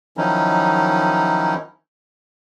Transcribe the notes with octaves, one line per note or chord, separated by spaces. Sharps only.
D#3 F3 F#3 C#4 D#4 E4